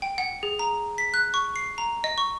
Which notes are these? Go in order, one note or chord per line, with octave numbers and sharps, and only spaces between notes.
G5
F#5
G#4
A#5
B6
F#6
C#6
C7
A#5
D#5
C#6